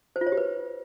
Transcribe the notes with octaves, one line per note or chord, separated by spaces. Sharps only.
C5
F4
C#5
G4
B4